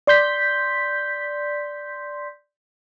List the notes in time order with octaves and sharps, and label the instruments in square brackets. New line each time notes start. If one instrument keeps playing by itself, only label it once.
[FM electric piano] D5 C6 G6 B6